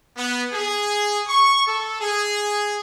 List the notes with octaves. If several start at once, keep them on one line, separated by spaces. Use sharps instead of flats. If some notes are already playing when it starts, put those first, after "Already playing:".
B3
G#4
C#6
A4
G#4